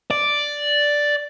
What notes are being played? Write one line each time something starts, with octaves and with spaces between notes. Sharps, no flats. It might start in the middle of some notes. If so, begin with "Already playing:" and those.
D5